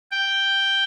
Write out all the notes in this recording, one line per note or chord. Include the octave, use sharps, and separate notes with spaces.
G5